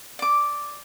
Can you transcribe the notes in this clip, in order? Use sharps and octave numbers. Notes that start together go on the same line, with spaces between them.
D5 D6